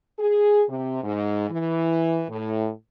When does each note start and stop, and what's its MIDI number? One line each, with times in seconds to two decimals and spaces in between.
0.19 0.62 68
0.69 1.02 48
1.03 1.48 44
1.50 2.22 52
2.28 2.68 45